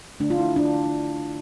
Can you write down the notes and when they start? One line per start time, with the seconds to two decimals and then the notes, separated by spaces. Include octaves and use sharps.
0.20 D3 A3 D4
0.30 F4
0.38 E4
0.56 D4